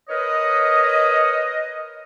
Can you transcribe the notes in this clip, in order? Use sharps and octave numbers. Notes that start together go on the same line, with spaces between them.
A#4 B4 C#5 D#5